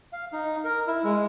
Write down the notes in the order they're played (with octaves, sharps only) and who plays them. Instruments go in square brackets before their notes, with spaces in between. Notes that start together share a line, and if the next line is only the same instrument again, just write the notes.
[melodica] F5
D#4
A#4
E4
G#3